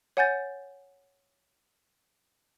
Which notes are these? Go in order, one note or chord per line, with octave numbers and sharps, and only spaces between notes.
C#5 F#5 G#5 G6 A6